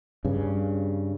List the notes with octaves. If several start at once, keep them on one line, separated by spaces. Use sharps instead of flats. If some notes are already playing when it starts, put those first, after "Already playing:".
G2 C#3